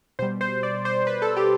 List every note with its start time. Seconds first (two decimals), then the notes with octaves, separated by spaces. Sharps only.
0.19 B2 G3 C5
0.41 C5
0.63 D5
0.85 C5
1.07 B4
1.22 A4
1.37 G4